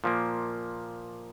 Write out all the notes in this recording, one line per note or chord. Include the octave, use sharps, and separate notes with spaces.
A#2 F3 A#3